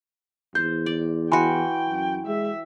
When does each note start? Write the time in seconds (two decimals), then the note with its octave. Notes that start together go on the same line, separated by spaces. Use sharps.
0.55 E2 C5 G6
0.86 D5
1.32 E3 F#4 G5 G#5 B5 C6
1.89 F#2
2.26 G#3 E5